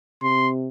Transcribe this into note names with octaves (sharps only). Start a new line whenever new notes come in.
C3 C6